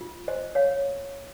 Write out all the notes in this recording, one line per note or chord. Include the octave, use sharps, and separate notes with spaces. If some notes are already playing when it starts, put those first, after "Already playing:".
F4
C5 D#5
C#5 F5